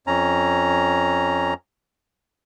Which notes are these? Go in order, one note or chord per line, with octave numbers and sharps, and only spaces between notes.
F2 C#4 A#5